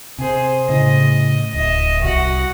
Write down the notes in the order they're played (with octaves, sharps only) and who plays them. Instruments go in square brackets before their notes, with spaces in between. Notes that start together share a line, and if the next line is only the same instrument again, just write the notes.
[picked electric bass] C3 [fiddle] G#4 C5
[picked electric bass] A2 C#3 [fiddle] D#5
[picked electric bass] D1 [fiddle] D#5 E5
[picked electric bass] C2 [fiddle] F#4 F#5